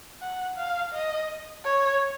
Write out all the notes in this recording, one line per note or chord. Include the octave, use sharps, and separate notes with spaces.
F#5
F5
D#5
C#5